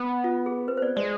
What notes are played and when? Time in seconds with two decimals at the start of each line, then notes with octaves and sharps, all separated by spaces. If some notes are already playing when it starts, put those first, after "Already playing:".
Already playing: B3
0.24 F4
0.46 G#4
0.68 C4 B4
0.77 C5
0.82 B3 D5
0.96 G#3 D5